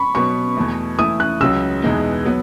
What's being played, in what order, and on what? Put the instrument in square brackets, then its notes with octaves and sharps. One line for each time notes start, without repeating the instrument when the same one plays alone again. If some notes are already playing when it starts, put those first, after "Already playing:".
Already playing: [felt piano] B5 C#6
[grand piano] B2 F#3 B3 [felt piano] C#6
[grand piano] E2 B2 A3
[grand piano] E3 A3 E4 [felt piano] D#6
[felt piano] F#6
[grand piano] C#2 C#3 F#3 [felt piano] E6
[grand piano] E2 B2 G#3 B3 D#4
F#3 B3